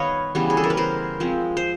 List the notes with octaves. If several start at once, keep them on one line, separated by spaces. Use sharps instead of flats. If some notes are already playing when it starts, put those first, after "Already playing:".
Already playing: D#3 G3 B3 B4 C#5 D#5 F5
C#3 E3 G3 B3
G#4
A4
A#4
B4
A#4 C5
F3 G#3 C4
C5